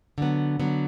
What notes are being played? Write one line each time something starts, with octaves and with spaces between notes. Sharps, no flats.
D3 F#3 B3
D3 F#3 B3